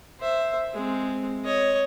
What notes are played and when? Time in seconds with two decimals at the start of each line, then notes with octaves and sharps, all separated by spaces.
0.19 C5 E5
0.73 G#3 C4
1.45 C#5 D#5